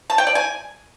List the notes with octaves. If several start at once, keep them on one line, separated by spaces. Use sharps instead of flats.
A5
G5
D5
G#5